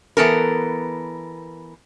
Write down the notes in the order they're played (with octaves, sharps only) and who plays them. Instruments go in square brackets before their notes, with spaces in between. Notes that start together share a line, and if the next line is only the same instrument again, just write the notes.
[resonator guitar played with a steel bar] E3 B3 A4 A#4